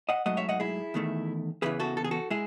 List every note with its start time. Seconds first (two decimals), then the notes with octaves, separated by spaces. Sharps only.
0.09 D#5 F#5
0.26 G#2 F#3 A3 D#5 F#5
0.37 C#5 E5
0.49 D#5 F#5
0.60 E4 G#4
0.94 E2 D#3 A3
1.62 E2 C#3 E3 G#4 B4
1.80 F#4 A4
1.97 A4
2.04 G#4
2.11 F#4 A4
2.30 G#3 E4 G#4